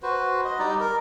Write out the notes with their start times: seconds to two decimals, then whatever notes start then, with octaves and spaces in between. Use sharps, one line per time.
0.03 F#4 B4 C5
0.45 D#5
0.59 G3 D#4 D5
0.80 A#4